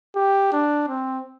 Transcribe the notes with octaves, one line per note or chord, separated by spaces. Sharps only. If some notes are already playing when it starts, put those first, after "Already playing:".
G4
D4
C4